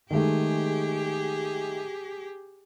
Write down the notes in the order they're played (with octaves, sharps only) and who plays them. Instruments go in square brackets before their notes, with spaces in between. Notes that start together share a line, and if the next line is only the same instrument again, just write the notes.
[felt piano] D#3 G#3 A3 [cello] G4 G#4